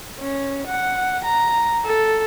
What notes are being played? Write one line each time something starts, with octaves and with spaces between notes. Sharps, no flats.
C#4
F#5
A#5
A4